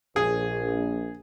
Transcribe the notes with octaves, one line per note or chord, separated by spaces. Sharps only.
A#1 G#4